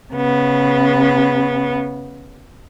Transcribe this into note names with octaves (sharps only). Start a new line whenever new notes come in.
C#3 B3